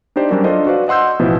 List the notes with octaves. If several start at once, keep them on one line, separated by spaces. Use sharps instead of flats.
D4 D#4 G4 C5 D5
F#3 G3 C#4 D4 F#4 A#4
D4 F4 A4 C5 D#5
F#4 B4 C5 D5 F5
D#5 F#5 C6 E6 G6
A1 B2 F3 B3 E4